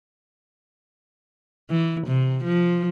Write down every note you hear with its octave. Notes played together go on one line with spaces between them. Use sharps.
E3
C3
F3